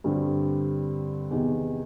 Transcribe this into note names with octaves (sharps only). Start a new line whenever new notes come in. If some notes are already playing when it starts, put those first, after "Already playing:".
G2 D3 G3 C4
E2 C3 D#3